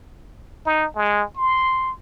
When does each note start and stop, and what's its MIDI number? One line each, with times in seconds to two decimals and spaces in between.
0.66 0.86 63
0.96 1.23 56
1.36 1.91 84